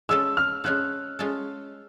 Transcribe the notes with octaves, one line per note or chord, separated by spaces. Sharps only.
G#3 C#4 F4 A4 E6
F6
G#3 C#4 F4 A4 F#6
G#3 C#4 F4 A4